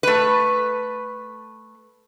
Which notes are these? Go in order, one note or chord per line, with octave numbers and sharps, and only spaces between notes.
A3 B4